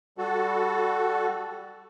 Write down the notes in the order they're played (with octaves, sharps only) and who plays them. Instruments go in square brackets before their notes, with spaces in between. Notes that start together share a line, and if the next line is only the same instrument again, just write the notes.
[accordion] G3 F#4 A4